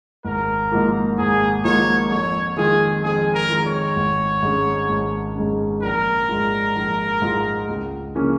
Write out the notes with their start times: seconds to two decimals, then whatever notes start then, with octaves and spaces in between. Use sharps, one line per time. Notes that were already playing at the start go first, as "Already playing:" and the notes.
0.25 G#1 A#4
0.72 G#2 F3 A#3 F4
1.18 G#1 G#4
1.64 G#2 F3 A#3 F4 C#5
2.11 F2 C#5
2.57 D#3 G#3 F4 G#4
3.03 F2 G#4
3.34 A#4
3.50 D#3 G#3 F4
3.66 C#5
3.96 G#1
4.42 G#2 G#3 C#4
4.89 G#1
5.36 G#2 G#3 C#4
5.82 A#1 A#4
6.29 G#2 G#3 F4
6.76 A#1
7.22 G#2 G#3 F4
7.69 C#2
8.15 C#3 F3 A#3 C#4